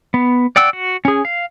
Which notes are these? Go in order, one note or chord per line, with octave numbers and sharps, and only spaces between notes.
B3
D5 F#5 G5 E6
F#4
C#4 G#4
F5